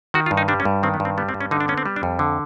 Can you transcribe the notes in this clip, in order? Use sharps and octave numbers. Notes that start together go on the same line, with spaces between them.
D#3 F#4
F4
G2
D#4
G3 D4
C#4
G2
D#3 C4
B3
G2
C4
G3 B3
C4
G2
C#4
D3 D#4
D4
B3 C#4
C4
G3
D4
F2
D3